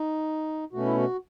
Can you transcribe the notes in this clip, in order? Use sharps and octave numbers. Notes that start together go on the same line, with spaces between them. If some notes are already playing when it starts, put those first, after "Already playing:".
Already playing: D#4
B2 A3 C#4 F#4
E4
F#4